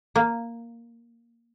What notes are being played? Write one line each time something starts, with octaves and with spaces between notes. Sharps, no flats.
A#3